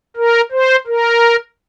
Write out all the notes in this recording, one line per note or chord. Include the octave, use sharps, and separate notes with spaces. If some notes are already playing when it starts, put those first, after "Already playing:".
A#4
C5
A#4